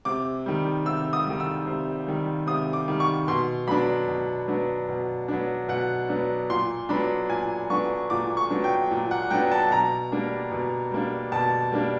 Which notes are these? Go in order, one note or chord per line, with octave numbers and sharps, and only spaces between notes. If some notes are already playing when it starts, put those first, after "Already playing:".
C3 D6
D#3 G3
C3 E6
D#6
D#3 G3
E6
C3
D#3 G3
C3 D#6
D6
D#3 G3
C#6
B2 C6
F#3 B3 D4 B5
B2
F#3 B3 D4
B2
F#3 B3 D4
B2 F#5
F#3 B3 D4
A#2 C6
F#3 B3 D4 B5
A#2 G#5
F#3 B3 D4 C#6
A#2 D6
C#6
F#3 B3 D4
G5
A#2
F#5
F#3 B3 D4 G5
A5
B2 A#5
G3 A#3 D4
B2
G3 A#3 D4
B2 A5
G3 A#3 D4